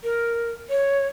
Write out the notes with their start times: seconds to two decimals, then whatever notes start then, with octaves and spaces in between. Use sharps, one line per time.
0.03 A#4
0.70 C#5